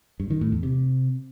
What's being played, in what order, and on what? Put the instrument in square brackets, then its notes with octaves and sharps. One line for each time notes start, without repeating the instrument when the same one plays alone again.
[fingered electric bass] G2
D#3
A2
E2
C3